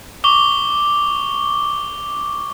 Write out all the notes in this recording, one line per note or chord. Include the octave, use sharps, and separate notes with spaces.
C#6 D6 G7